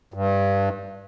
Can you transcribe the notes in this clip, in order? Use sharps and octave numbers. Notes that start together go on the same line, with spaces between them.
G2